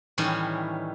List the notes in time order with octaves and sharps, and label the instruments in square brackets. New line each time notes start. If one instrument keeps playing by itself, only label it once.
[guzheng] A2 D#3 E3 G3 C#4